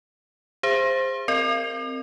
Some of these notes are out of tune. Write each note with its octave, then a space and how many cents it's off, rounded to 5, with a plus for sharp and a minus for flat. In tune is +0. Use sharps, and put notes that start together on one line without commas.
G#4 -35 C5 +0 E5 +45
C4 +0 A#4 -20 D#5 -40